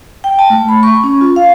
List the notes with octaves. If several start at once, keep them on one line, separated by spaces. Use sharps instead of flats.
G5
A5
A3
B5
C#6
C#4
F4
F5